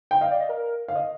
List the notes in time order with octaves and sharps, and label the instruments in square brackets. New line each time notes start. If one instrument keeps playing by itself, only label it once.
[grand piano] G5
[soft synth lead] D#5 [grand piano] F5
[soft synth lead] D5
D#5
A#4
[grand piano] F5
D#5